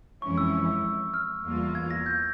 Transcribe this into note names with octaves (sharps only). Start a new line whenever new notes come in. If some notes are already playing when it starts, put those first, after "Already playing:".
F2 E3 G#3 C#4 E4 C#6
E6
F6
E2 E3 G3 A#3 F4
G#6
A#6
G6